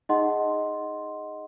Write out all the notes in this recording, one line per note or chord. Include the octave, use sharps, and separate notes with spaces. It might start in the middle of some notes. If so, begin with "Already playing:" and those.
D#4 G#4 D#5 F#5 C6